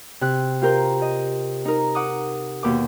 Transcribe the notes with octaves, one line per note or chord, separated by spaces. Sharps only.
C3 F#6
F4 G4 A#4 C5
D#5
D#4 A#4
F#5 D6 D#6
D#2 B2 D6